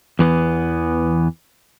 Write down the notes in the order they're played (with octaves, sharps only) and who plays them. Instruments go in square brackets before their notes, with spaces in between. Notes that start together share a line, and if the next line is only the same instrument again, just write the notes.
[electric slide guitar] E2 E3 B3